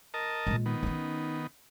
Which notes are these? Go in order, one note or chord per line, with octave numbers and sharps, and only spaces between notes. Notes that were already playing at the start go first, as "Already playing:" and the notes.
A#4 D#5 A5
A#2 G#3
D#3 B3
C#4 D#4